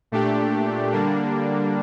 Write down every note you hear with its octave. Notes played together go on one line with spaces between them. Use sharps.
A#2 A3 D4 G4
D3 G3 A#3 D4